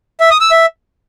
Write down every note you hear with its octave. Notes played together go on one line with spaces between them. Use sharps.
E5
D#6
E6
E5